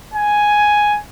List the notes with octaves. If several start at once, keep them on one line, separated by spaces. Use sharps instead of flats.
G#5